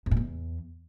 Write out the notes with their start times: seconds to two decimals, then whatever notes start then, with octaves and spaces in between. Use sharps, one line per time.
0.06 E2
0.11 A#2
0.17 E2